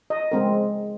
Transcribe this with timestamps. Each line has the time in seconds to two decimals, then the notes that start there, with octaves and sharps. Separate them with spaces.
0.10 D#5
0.32 G#3 C4 A#4